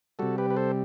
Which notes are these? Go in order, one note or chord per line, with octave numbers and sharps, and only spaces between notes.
C3 G3 F#4 A4
G4 B4
B4
A4 C5